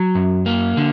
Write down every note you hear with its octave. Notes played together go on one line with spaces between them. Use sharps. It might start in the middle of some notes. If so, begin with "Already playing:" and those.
Already playing: F#3
F#2
A#3
D3